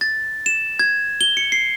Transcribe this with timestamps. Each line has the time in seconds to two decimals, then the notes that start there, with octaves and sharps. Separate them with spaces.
0.01 A6
0.46 E7
0.79 G#6
1.21 G7
1.37 C#7
1.52 C7